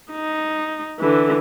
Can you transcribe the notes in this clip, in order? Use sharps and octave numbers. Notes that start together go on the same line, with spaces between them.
D#4
D3 E3